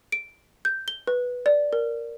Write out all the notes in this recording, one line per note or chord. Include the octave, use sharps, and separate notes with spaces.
D7
G6
G7
B4
D5
A#4